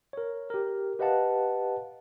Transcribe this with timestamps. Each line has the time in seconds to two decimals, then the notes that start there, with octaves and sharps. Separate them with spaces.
0.13 A#4 C#5
0.50 G4 A#4
0.99 G4 B4 D#5 F5 F#5 A5